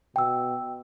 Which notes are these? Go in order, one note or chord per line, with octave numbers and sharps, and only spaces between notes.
B2 G5 E6